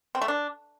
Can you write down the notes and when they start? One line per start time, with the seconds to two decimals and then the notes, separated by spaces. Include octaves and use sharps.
0.15 C4
0.22 A3
0.28 D4